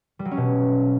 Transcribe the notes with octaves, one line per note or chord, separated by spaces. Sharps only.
G3
F#3
C#4
B2